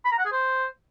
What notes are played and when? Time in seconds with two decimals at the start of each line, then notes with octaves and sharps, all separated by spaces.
0.05 B5
0.12 A#5
0.19 F#5
0.25 G#4
0.32 C5